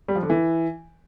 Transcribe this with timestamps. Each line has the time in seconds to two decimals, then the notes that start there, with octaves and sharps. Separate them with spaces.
0.08 G3
0.16 F3
0.23 D3
0.30 E3